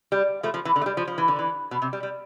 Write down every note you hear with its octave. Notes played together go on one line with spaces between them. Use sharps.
G3
F3 A3
F3
E3
D3
A3
G3
F3
F3
E3
D3
E3
B2
C3
G3
G3